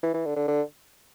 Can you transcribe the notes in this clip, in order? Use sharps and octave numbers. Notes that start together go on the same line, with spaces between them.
E3
E3
D3
D3
D3